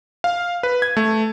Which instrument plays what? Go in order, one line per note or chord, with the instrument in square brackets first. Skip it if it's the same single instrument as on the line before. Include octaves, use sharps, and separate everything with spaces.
[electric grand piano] F5
B4
G#6
A3